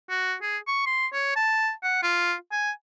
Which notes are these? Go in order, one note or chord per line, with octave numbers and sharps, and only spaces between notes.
F#4
G#4
C#6
C6
C#5
A5
F#5
F4
G#5